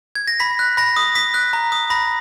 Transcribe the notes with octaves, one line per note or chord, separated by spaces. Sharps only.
G#6
A#6
B5 B6
F#6
B5 A#6
D#6
D#6 B6
F#6
A#5
D#6
B5 A#6